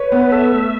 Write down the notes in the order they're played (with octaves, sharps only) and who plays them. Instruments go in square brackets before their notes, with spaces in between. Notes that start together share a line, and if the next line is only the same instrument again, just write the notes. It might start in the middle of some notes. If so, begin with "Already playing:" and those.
Already playing: [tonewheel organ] B4 [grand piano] C#5
[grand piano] B3
[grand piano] A4 [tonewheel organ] E5
[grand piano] A3